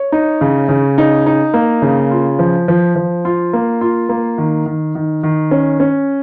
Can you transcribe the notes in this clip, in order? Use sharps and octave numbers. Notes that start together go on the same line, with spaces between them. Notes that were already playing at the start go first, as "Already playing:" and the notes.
Already playing: C#5
D#4
C#3
C#3
D#4
D#4
A#3
C#3
F4
F3
F3
F3
F4
A#3
F4
A#3
D#3
D#3
D#3
D#3
C#4
C#4